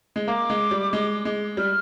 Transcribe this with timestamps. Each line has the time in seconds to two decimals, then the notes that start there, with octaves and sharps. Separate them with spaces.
0.16 G#3
0.28 A#3 D6
0.50 G#3
0.71 G3
0.93 G#3
1.25 G#3
1.57 G3 F6